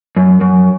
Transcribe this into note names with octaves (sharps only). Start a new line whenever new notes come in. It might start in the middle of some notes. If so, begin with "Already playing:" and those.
F#2
F#2